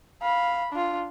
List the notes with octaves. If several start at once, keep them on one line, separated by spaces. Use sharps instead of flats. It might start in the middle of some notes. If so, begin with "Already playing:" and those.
F5 B5
D4 F4